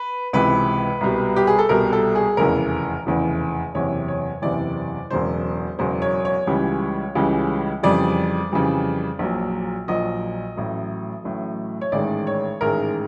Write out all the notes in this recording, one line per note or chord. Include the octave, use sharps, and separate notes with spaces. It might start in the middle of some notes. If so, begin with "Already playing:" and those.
Already playing: B4
C#2 C3 E3 B4
C2 B2 G3
G4
G#4
A4
C2 B2 G3 A#4
A4
G#4
F1 E2 C#3 E3 A#4
F1 E2 C#3 E3
F#1 E2 C3 E3 C#5
C#5
F#1 E2 C3 E3 D5
E1 E2 C#3 F#3 C5
E1 E2 C#3 F#3 C5
C#5
C#5
C#2 C#3 E3 G3
C#2 C#3 E3 G3
F2 C#3 E3 G3 D5
F2 C#3 E3 G3
A#1 A#2 F#3
A#1 A#2 F#3 D#5
A1 A2 F#3
A1 A2 F#3
C#5
A1 G#2 D#3 G#3 D5
C#5
A1 G#2 D#3 G#3 A#4